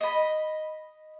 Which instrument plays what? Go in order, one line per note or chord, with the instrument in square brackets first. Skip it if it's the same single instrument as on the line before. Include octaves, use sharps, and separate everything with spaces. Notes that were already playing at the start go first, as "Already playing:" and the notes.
[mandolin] D#5 B5